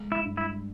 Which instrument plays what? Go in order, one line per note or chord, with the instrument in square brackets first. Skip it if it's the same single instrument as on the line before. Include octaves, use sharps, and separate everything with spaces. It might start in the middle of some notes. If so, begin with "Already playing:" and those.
Already playing: [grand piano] G#3
[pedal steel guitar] E4 E5
[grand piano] G2
[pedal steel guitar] E4 E5